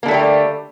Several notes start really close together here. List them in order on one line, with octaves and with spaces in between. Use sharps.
A#3 D3 A3 G3 G4